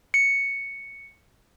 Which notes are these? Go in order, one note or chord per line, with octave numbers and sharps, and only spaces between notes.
C#7